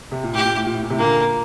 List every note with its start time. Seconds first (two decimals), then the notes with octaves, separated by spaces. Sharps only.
0.12 C3
0.23 A#2
0.33 A2 G4
0.44 A#2
0.56 A2
0.66 A#2
0.74 A2
0.83 A#2
0.90 A2 C3
0.99 A#2 D3 A#3